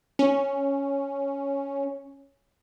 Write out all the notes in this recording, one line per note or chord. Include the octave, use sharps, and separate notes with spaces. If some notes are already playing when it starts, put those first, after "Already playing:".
C#4